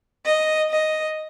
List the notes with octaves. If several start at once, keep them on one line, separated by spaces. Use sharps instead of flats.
D#5
D#5